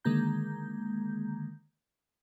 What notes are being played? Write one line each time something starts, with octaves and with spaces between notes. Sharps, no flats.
D3 D#3 G#3 A#3 A#5 G6